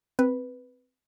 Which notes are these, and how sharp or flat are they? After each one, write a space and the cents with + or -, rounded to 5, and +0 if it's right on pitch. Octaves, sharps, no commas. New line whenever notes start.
C4 -15 B4 +0